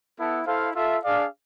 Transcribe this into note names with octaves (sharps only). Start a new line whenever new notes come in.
B3 E4 A4
E4 A4 C5 F5
F4 A4 E5
D4 G#4 D5 F5